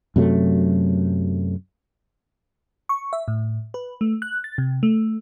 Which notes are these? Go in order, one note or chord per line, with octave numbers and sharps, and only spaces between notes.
F#2 C3 F#3 A3
C#6
E5
A2
B4
A3
F#6
A6
C3
A3